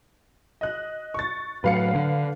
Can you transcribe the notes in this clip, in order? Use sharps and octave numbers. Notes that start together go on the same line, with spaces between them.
D#5 F#6
C#6 A6
A2 F#3 B4 F5 C#7
D3